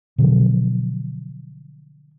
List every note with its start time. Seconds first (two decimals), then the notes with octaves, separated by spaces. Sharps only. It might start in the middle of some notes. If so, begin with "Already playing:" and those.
0.18 B2 D3 F3 F#3